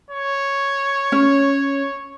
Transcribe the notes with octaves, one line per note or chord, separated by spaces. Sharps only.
C#5
C#4